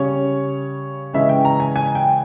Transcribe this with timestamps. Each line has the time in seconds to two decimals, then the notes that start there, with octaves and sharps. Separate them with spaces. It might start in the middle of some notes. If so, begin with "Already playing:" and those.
Already playing: C#3 G3 C#4 C#5
1.13 C#3 E3 G#3 C#4 E5
1.29 G5
1.45 A#5
1.60 G#5
1.76 G#5
1.95 G5